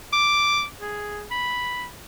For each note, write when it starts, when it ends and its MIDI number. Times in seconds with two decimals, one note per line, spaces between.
0.13 0.65 86
0.81 1.23 68
1.31 1.85 83